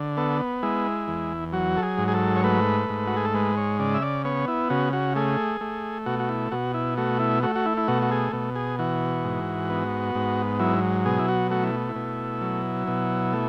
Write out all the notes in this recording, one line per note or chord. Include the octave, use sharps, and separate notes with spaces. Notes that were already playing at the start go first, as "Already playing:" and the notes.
Already playing: D3
B3 A4
G#3 E4
E2
F#3 F#4
A4
G#4
G#2
G#4
A4
C#5
A3 B4
G#2
F#4
G#4
A4
G#3 B4
C#5
C#3 D5
E5
D5
B3 C#5
E4
C#3 F#4
F#4
A3 G#4
A3
B2 F#4
F#4
E4
B2 F#4
E4
A3 F#4
E4
A3 F#4
F#4
E4
E4
B2 F#4
F#4
G#4
B2
G#4
E3 F#4
G#2
B3
G#2
F#3 E4
B2 G#4
E4
F#4
A3 F#4
E4
E4
B2
F#3
B2
A3